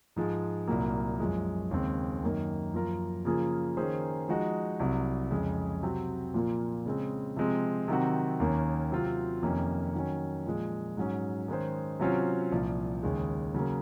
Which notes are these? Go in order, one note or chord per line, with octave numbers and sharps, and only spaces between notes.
G#2 F3 G#3
C2 A#2 F#3 A#3
F#2 F3 G#3
D#2 C#3 G#3 C4
F#2 D#3 A#3 D#4
F#2 F3 A#3 F4 A#4
C#3 F3 A#3 F4 G#4
D#3 A#3 C#4 G#4 C5
F3 G#3 D#4 F#4
C2 C3 F#3
F2 C#3 G#3
C3 F#3 C4 F#4
A#2 F3 A#3 F4
C#3 G#3 C4
C3 F3 G#3 C4
C3 D#3 F#3 C4 F#4
D#2 D#3 A#3 C#4
C3 F#3 C4 F4
F2 C3 D#3 A#3 C#4
D#3 F#3 C#4
A#2 F3 G#3
G#2 F#3 C#4
D#3 G#3 C#4 G#4 C5
C3 F#3 C#4 F4 C5
C2 A#2 F3
D#2 C#3 G#3
C#3 F#3 A#3